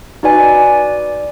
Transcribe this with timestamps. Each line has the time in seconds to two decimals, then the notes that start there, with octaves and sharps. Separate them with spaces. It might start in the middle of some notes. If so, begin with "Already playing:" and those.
0.23 D#4 F#4 B4 D5 G#5
0.43 D5